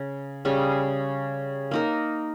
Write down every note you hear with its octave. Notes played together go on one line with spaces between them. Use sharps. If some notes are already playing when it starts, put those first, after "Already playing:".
Already playing: C#3
C#3 G3 C#4 G#4
A#3 D#4 A#4